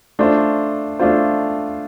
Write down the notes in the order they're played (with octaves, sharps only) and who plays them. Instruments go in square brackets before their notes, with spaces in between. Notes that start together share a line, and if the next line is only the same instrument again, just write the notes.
[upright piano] A3 D4 F4 C5
A3 D4 F4 C5